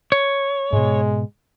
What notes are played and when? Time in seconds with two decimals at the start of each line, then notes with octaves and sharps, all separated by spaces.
0.12 C#5
0.73 G#2 B2 G#3